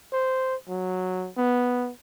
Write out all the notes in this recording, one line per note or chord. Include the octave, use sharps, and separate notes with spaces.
C5
F#3
B3